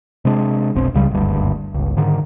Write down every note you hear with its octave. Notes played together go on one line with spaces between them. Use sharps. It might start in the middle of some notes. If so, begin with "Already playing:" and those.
C3 G#3 B3 D4
F1 B1 C4
C#2 C#3 G3
F#1 D2 G2
G1 C#2
G#2 D3 D#3